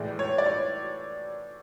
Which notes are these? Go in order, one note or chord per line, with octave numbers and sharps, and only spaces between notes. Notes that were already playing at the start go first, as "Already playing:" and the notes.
Already playing: A2 E3 G#3 D5
C#5
D5
C#5